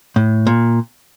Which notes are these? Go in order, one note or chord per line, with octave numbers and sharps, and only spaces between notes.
A2
A#2